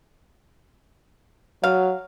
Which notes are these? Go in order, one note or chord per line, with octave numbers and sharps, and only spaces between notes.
F#3 F5